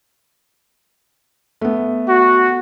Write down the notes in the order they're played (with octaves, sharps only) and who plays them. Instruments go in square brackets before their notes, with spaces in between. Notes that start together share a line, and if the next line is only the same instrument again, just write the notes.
[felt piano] A3 B3
[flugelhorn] F#4